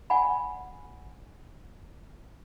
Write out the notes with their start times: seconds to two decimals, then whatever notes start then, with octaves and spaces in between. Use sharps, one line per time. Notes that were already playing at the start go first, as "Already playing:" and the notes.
0.10 D5 F#5 G#5 B5